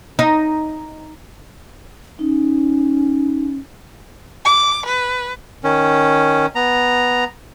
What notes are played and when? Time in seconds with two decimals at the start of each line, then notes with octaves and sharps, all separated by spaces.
0.19 D#4
2.19 C#4 D#4
4.45 D6
4.86 B4
5.64 D#3 C#4
6.55 B3 A#5